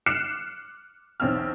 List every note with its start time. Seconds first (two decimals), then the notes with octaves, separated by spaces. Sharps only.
0.06 D6 F6 F#6 C7 C#7 E7
1.20 B1 E2 C4 C#4 E6 F6